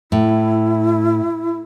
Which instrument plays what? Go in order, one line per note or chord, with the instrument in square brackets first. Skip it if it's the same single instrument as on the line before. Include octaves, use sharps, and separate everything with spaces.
[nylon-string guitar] A2 [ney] E4